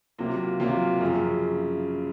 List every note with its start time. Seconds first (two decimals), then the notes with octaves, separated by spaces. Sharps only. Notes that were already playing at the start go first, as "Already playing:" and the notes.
0.18 C3 F#3 A#3 F4
0.60 C3 F#3 A#3 F4
1.00 F#2 C#3 F3